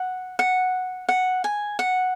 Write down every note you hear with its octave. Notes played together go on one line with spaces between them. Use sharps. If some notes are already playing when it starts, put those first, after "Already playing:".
Already playing: F#5
F#5
F#5
G#5
F#5